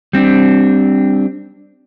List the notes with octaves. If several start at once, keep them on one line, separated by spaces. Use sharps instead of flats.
G3 C4 D4